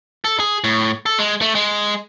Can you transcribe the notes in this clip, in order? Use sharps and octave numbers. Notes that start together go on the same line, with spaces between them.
A4
G#4
A2
A4
G#3
A3
G#3